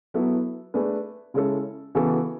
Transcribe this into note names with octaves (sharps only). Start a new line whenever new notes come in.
F#3 B3 E4 A4
A3 D4 G#4 B4
C#3 G#3 C#4 E4 A4
C#3 E3 B3 F#4 A4